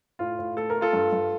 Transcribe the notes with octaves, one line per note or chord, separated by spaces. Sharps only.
A2 F4
A2
A3 A4
A#4
A3
F4 A4
G2
G2